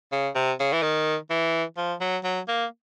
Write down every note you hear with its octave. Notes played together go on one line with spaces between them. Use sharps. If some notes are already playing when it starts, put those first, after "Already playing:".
C#3
C3
C#3
E3
D#3
E3
F3
F#3
F#3
A#3